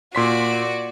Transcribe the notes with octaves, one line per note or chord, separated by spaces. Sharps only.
A#2 F#4 D5 C6 B6